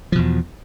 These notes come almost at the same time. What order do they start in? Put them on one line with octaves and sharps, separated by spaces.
F3 B2 E2